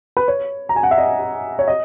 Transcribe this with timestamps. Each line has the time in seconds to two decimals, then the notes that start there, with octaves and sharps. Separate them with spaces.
0.17 B4
0.28 C#5
0.69 A#5
0.76 G#5
0.83 F#5
0.91 E5
0.98 D#5
1.59 C#5
1.68 D#5